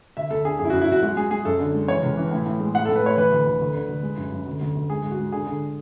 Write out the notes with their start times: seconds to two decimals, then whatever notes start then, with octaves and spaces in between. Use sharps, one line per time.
0.17 D2 E5
0.31 D2 A4
0.45 D3 G#4
0.59 F#2 G#4
0.65 E4
0.70 F#4
0.73 F#2
0.81 E4
0.88 F#2 F#4
1.02 G#3 F#4
1.17 G#3 G#4
1.31 G#3 G#4
1.45 F#2 A4
1.60 D3
1.74 G#3
1.88 E3 C#5
2.03 C#2
2.17 E3
2.31 A2
2.46 A2
2.60 G#3
2.75 A2 F#5
2.85 A4
2.89 A2
2.96 B4
3.03 A3 C#5
3.17 E3 B4
3.31 D2
3.46 D2
3.61 D2
3.74 D3
3.89 D2
4.03 G#3
4.17 F#2
4.32 F#2
4.46 D2
4.61 D2
4.75 D2
4.90 G#3 G#4
5.04 G#2
5.11 F#4
5.19 G#3
5.32 D3 G#4
5.47 D3